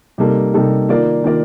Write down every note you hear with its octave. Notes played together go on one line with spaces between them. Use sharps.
C3 G3 A#3 D#4 A4
C3 G3 A#3 D#4 A4
D#3 A#3 F4 A#4 D5
D#3 A#3 F4 A#4 D5